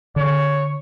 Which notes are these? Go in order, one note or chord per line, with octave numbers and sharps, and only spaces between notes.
D3 C#5